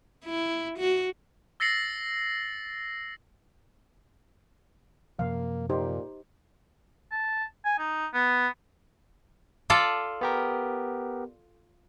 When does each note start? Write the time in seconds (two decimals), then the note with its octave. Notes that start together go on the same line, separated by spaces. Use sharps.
0.25 E4
0.79 F#4
1.60 E6 A6 A#6 C7 C#7 F#7
5.19 F#2 C3 F3 A#3 F5
5.70 A#2 D#4 G4 C5
7.11 A5
7.65 G#5
7.79 D#4
8.14 B3
9.70 F4 A4 D5
10.21 B3 G4 A#4